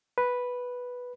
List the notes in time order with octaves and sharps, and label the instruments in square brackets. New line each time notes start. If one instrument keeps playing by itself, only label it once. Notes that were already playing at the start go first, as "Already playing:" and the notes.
[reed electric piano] B4